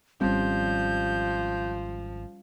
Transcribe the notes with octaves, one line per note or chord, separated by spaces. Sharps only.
G#1 F3 G3 C4 C#4 G6